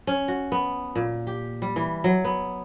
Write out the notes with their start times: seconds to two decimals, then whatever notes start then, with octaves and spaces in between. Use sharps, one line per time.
0.07 C#4
0.28 F#4
0.52 B3
0.96 A#2
1.27 G4
1.62 G3
1.76 E3
2.04 F#3
2.25 B3